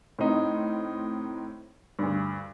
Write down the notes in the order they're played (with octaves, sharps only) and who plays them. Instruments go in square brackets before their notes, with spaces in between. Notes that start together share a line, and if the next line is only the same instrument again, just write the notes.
[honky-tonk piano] A2 C4 D#4
D2 G2